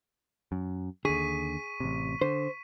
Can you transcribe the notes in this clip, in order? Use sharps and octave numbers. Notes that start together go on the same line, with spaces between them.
F#2
D#2 D3 G#4 C#6 B6 D#7
A1 C3
D3 C5